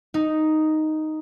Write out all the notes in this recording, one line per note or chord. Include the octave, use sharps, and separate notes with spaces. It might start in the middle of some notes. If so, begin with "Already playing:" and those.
D#4